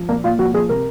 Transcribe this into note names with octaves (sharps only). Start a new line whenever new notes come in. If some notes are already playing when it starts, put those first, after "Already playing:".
Already playing: F3
A#2 A#3
A#2 F4
F3 F#4
F3 G#4
C3 A#4